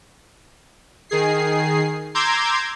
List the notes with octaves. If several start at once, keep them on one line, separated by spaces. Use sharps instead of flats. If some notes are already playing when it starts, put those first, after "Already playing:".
D#3 G#4 C7
A#5 C6 D6 E6 G6 G#6